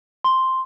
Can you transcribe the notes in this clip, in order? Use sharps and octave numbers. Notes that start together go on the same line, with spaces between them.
C6